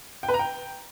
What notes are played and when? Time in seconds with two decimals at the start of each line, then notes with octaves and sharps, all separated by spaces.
0.23 G5
0.28 B4
0.34 A#5
0.39 G5